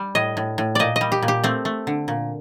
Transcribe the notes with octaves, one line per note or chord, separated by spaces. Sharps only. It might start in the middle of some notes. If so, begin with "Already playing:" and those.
Already playing: G3
A2 D#5
A2
A2
A#2 D5 D#5
D#5
G3
G4
A#2
G4
A3 C4
A3
D3
A#2